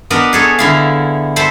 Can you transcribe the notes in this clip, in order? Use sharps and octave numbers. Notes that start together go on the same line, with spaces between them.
B3 D4 A#4 B4 D#5
G#4 A4 C#5
D3 E4 F5
A4 C5 E5 A5 B5